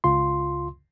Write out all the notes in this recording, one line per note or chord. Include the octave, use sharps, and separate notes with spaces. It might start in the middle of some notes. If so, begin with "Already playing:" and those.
C#2 F4 C6